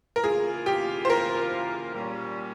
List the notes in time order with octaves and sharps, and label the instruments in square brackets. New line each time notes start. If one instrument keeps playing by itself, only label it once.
[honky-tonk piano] A#4
[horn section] C#3 E3 A#3 F4 [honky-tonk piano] G#4
[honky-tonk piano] G4
C5
A#4
[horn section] A#2 G3 C#4